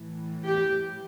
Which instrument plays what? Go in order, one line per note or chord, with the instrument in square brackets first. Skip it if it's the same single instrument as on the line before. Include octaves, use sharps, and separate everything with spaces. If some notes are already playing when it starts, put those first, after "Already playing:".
Already playing: [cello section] A2 E3
G4